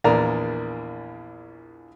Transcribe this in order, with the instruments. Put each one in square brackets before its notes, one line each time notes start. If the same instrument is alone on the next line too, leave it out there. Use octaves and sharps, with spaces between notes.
[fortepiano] A#1 E2 A#3 D5 A#5